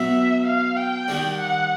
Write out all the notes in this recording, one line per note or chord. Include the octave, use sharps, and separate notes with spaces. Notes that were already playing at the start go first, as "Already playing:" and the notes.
Already playing: B2 F#3 B3 E5
F5
G5
D#3 G3 A#3 D4
F#5